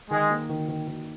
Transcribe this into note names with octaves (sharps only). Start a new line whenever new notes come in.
D#3 G#3
A#3
D#3
D#3
D#3